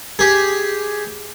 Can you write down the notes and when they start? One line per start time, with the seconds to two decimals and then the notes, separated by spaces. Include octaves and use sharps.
0.19 G4 G#4